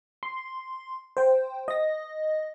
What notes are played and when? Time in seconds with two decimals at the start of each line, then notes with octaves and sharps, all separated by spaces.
0.23 C6
1.17 C5 G5
1.68 D#5 A#6